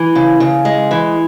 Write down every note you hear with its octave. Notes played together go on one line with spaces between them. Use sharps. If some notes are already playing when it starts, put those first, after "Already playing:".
Already playing: E3
C#3
C#3
G#3
E3